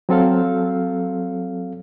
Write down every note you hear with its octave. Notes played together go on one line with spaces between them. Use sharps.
F#3 C4 A4 F5